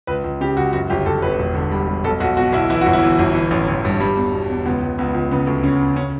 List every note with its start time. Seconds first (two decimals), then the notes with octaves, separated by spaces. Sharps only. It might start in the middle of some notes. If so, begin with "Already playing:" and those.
0.07 C#2 B4
0.24 C#2
0.41 C#3 G4
0.57 C#2 F#4
0.73 F#2 F#4
0.90 G1 G4
1.06 G1 A4
1.22 G1 B4
1.39 E1
1.55 D3
1.71 G3
1.87 G3
2.04 B1 A4
2.20 B1 F#4
2.37 B2 F#4
2.53 B1 E4
2.70 E3 E4
2.81 F#4
2.86 G1
2.93 E4
3.03 E3
3.19 G1
3.35 E3
3.51 A1
3.68 A1
3.85 G2
4.00 G3
4.17 E2
4.33 B2
4.50 E2
4.65 C#2 B3
4.82 C#2
4.98 C#2 B3
5.14 C#2
5.31 C#3 B3
5.47 D2
5.63 C#3 C#4
5.80 C#3
5.96 C#4